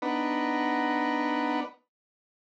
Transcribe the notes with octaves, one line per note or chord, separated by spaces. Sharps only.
B3 D4 D#4 B4 F#5 A#5